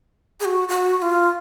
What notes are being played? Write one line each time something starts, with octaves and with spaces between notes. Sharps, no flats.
G#4
F#4
F#4
F#4
F4